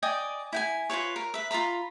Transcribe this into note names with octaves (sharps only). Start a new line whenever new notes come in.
D5 D#5 G5 G#5
E4 G5 G#5
F4 G#4 B4 C#5
A#4
B4 E5
F4 F5 A#5 B5